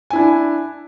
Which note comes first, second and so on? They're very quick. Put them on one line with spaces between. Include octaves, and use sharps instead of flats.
G#5 E4 D4